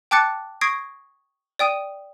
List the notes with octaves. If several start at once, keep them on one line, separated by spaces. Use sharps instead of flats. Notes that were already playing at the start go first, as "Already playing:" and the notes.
G5 A5 D6 F#6 A6 C#7
C#6 D#6 G#6 A#6 C7 D7
D5 G5 D#6 D#7